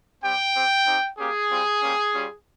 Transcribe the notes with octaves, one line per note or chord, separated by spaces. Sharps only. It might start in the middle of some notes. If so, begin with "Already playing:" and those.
G3 C4 G4 G5
C4 G4
C4 D#4 G4
A#3 C#4 G4 G#4
G3 C4 F4
G3 A#3 C#4 G4
G3 C#4 F4